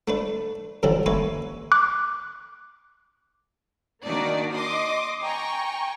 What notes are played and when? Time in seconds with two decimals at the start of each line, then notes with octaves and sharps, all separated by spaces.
0.08 A3 D4 B4
0.83 F#2 A2 D3 E3 F3 G3
1.06 A#3 C#4 B4 C#5 E5
1.72 D6 F#6
4.06 D#3 A#3 D4 D#4 F#4 D5
4.53 D#5 C6 D6 D#6
5.21 G5 G#5 A#5 C#6